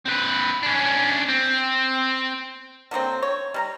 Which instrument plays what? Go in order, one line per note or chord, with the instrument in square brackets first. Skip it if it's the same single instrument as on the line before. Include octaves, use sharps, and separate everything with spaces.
[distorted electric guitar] C4 B4
C#4 D4
C4
[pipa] D3 F#3 A#3 C4
C#5
G3 A#4 A#5